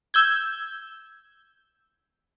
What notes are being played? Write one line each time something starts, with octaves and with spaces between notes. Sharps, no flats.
E6 G6 G#6